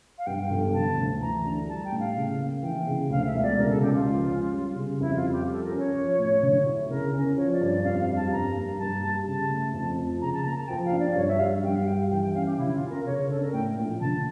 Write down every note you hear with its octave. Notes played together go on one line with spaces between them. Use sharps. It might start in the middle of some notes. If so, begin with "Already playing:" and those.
F5
G2 G5
G1
D3 A5
D2
E3 A#5
D4
G3 A5
G5
A2
F5
C#3
A#3
E3 G5
C#3
D2 F5
E5
E1
D5
C#3 A#4
A4
C#2 G4
F4
F3
C#4
G3
C#3
F2 E4
F4
G3
G4
F3
A4
A#4
C#4
C#5
F3
A2
D3
E4
C#3 A#4
C#4
F3 C#5
D5
G2
D5
F2 F5
F5
G3
A5
G2 A#5
A#3
G2 A5
G3
C#3 A5
A3
F2
F3
C#3 A#5
A5
A#3 A#5
A5
F3 G5
F5
D4
D5
G2 C#5
E5
G3 F5
G2 G5
F5
G3 G5
E3 G5
G5
C#4 F5
G4
D3 E4
F4
C#4
A#4
C#3 C#5
D4 A4
A#4
A2 G5
A#1
D3 A5